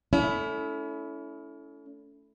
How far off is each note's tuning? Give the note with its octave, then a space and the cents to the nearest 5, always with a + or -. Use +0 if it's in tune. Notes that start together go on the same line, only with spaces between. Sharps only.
A3 +0 C#4 +40 E4 +0